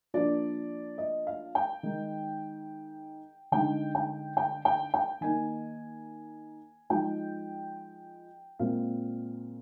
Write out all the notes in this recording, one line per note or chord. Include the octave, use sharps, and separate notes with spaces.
F3 A#3 D4 D5
D#5
F5
G5
D#3 G#3 D#4
D3 G#3 D#4 G5
G5
G5
G5
G5
D#3 A#3 D#4 G#5
F3 G#3 D#4 G5
A#2 G#3 C4 F5